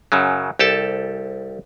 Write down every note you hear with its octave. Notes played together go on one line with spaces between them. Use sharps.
F#2 C#3 F#3
C2 G4 A4 A5